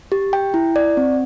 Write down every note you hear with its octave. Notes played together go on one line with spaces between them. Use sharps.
G4
G5
E4
D5
C4